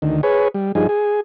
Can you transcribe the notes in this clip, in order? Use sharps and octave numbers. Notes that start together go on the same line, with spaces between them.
D2 D#3
G#4 B4 C#5
G3
G2 F3 D#4 G#4
G#4